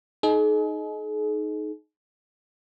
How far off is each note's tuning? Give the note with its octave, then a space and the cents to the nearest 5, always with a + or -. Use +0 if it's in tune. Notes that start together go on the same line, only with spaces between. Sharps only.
D#4 +0 G#4 +40